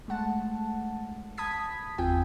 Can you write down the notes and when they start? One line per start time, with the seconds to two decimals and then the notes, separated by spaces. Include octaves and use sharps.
0.08 G#3 A3 F#5 A5
1.38 A5 B5 D#6 G#6 B6
1.98 G1 E2 C4 F4 G5 G#5